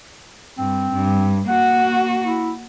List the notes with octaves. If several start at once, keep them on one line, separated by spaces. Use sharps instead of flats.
G2 C4
G2
A#3 F#4 F#5
E4